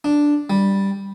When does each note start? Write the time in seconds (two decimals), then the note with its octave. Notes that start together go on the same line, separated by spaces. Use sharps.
0.04 D4
0.50 G3